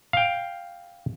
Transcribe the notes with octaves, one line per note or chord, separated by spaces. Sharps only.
F5 G5